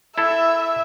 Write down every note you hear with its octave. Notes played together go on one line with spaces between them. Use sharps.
E4 A4 E5